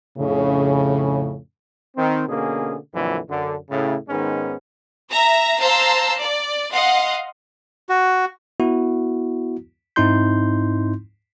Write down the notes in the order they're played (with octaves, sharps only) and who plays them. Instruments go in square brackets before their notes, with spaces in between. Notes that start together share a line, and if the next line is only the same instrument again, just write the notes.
[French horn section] F2 A2 C#3
[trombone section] D#3 C4
B2 D3 A#3 C#4 G#4
F2 A#2 D3 E3 F#3
F#2 D3
A2 C#3
G#2 D#3 G#3 B3 C#4
[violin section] E5 A#5 A#6
C5 F5 A5 A#5 C6 E6
D5
D#5 F5 F#5 C6
[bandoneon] F#4
[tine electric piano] B3 E4 F#4
G#2 C4 D#4 E4 C6 G6